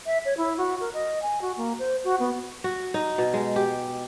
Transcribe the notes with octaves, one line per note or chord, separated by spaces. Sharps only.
E5
C#5
E4
F#4
A#4
D#5
G#5
F#4
A#3
C5
F#4
B3
F#4
D#4
B2
G#3
G4